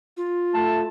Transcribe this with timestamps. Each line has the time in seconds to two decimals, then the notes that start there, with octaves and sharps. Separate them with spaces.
0.17 F4
0.54 A3 A5